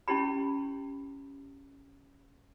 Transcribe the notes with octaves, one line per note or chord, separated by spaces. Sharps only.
C#4 E4 G4 B5